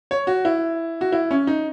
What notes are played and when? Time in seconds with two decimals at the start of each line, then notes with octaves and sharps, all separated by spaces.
0.11 C#5
0.27 F#4
0.45 E4
1.01 F#4
1.12 E4
1.31 C#4
1.47 D#4